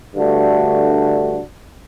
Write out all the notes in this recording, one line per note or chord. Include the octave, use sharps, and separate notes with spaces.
G2 D3 A3 D4 F#4